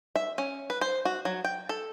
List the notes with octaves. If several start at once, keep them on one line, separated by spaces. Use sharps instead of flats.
E5
C#4
B4
C5
F#4
F#3
G5
A4